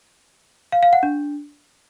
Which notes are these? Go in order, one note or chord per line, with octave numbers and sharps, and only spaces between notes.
F5
F5
F#5
D4